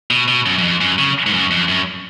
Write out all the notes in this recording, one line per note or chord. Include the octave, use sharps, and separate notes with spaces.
B2
B2
F#2
F#2
F2
F#2
C#3
G#2
F#2
F2
F#2